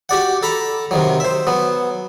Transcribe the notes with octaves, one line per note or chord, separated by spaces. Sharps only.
F#4 G4 D5 F#5
A4 A#5 B5
C3 D#3 F#3
C5 E5
F#3 B3